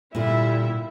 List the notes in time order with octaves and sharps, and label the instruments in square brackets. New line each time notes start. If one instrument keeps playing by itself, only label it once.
[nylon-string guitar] A#2 D3 [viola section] G3 E4 E5